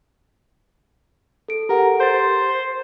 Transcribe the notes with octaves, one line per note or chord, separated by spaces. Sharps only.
A4 D7
G4 A#4 F#5
C5 G6 A6